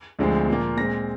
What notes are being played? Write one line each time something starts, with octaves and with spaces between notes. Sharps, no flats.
D2 D3 F3 G#3 C4
A#2 F3 A#3
A#2 G#3 C4 A#6